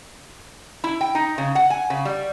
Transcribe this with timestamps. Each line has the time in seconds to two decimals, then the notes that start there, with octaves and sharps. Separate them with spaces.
0.84 E4
1.01 G5
1.15 D#4
1.38 C#3
1.55 F#5
1.70 G#5
1.90 C#3
2.05 G3